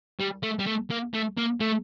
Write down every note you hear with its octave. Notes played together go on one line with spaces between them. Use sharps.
G3
A3
G3
A3
A#3
A3
A#3
A3